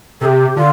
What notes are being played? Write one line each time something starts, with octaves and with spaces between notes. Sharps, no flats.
C3 G4 A4
D3 F4